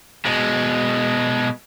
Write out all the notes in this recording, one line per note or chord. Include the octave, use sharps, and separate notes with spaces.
B2 G#3